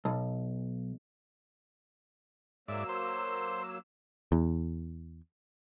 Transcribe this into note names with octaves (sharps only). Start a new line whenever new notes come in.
B1
G#2 F#3 A#3 D5 E5 E6
C5
E2